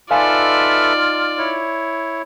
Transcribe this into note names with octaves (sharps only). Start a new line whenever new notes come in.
D#4 F4 A4 B4 D5 E5 F5 G#5
E4 C#5